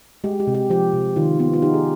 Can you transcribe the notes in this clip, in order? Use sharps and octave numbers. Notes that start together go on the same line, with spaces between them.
G#3 G4
G4
C3
G4
F3 G4
C3
D#3 F4
B3 F4
F4
D#4 G4
G#4